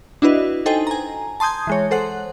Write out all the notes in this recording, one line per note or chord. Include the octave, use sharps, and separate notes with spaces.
D4 E4 F#4 B4 D#5
D#4 A4 C5 D#5 G5 G#5
G#5 A#5
A5 C6 D#6 G6 G#6
E3 G#3 C#5
A4 C5 F#5 F#6